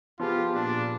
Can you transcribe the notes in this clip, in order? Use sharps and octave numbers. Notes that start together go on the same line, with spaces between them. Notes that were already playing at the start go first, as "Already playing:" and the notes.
F3 B3 F4 G4 G#4 A5 C6
A#2 D4